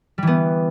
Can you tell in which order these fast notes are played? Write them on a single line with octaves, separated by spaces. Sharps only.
G3 E3 B3